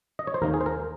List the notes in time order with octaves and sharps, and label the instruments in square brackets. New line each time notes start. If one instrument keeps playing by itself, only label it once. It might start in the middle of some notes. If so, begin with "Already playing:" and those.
[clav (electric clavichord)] D#5
C#5
C5
D#2 D#3 A#3 D#4 A#4
G#4
C5
A#4